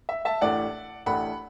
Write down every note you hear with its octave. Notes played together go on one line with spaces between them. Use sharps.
E5
E5 A5
A1 A2 A3 D4 D5 F#5
A1 A2 A3 D4 F#5 B5